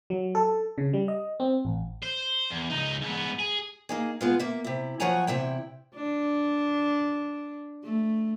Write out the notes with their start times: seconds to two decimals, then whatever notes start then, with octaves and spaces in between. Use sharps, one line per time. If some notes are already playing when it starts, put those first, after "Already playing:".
0.10 F#3
0.35 A4
0.78 C#3
0.93 G3
1.08 D#5
1.40 C4
1.65 A1
2.02 C5
2.51 E2
2.70 C#2 D#4
3.01 G#2 B3
3.39 G#4
3.89 A#3 D#4 G#4
4.21 G#3 B3 F4
4.39 A#3 E5
4.64 C3 E4
5.00 F3 F#3 C#5 F#5 G#5 A#5
5.27 E2 C3 E4 G5
5.96 D4
7.84 A3